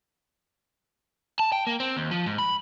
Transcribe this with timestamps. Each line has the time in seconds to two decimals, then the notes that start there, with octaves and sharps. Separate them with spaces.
1.39 A5
1.52 G5
1.67 A#3
1.80 C4
1.97 D#2
2.11 F3
2.26 G#2
2.38 B5